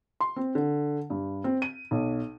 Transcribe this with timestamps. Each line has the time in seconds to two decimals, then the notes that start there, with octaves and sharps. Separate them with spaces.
0.21 C6
0.36 C4
0.55 D3
1.10 G2
1.44 C4
1.62 D#7
1.91 B1